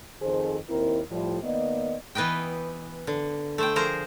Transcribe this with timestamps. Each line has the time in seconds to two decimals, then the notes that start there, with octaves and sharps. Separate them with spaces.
0.22 F2 D#3 G#4 A4 C5
0.69 D#2 C4 E4 A#4
1.11 A2 F3 G3
1.44 D#3 A#3 B3 D5 D#5
2.15 E3 B3 B4 D#5 G5
3.07 D3
3.58 A3 C5 G5
3.76 F3 G#4 A#4 C5 A#5